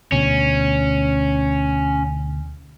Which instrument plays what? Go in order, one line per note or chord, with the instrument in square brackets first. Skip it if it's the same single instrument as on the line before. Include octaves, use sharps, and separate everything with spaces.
[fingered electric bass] D2 B2 [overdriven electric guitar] C#4